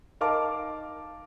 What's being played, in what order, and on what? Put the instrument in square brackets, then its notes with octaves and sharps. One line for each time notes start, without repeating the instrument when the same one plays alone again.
[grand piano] D#4 A#4 F5 A5 D6